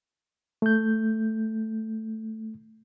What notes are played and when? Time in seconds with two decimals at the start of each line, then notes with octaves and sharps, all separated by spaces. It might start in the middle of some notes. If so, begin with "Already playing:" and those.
0.62 A3 G6